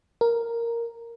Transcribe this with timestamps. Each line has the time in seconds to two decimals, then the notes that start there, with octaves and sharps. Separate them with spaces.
0.21 A#4